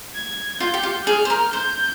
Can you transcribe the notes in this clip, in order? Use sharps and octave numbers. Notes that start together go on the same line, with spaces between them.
G#6
F4 G6
G4
F4
G#4 F6
C5
A#4
C5 G6